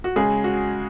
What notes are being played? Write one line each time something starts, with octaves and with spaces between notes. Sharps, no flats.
F#4
C#3 G#3 G#4
F#4